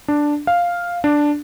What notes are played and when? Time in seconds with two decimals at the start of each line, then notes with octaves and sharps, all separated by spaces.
0.08 D4
0.47 F5
1.04 D4